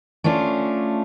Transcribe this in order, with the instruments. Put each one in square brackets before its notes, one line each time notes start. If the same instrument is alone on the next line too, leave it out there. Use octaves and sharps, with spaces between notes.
[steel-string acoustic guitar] A3 C#4 D4 F4